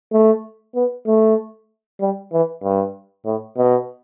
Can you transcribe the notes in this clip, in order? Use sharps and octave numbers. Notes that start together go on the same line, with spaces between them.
A3
B3
A3
G3
E3
G2
A2
B2